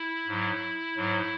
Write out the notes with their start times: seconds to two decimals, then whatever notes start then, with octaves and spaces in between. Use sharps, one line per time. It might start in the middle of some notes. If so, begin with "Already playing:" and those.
Already playing: E4
0.27 G#2 F#3
0.97 G#2 F#3